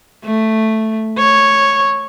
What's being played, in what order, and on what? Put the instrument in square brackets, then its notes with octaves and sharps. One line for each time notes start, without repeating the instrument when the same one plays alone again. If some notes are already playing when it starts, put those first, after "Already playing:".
[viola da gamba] A3
C#5